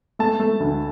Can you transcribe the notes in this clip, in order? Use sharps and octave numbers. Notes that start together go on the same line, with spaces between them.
A3 A5
A3
D2